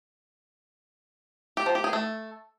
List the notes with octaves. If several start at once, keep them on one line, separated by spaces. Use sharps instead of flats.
G4
F3
G4
G#4
A3